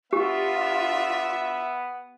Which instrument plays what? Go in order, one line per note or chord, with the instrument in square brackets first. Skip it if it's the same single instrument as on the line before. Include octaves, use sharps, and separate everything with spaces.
[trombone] B3 [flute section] D4 F4 [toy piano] G4 [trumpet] E5